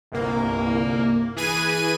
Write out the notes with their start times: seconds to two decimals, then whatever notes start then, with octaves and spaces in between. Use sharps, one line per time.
0.12 G1 C2 A#3
1.36 E3 G#4 B4 G#5 D#7